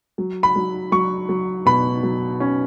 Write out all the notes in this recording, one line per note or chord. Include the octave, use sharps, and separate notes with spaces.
F#3
B5
F#3
F#3 C#6
F#3
B2 B5
F#3
C#4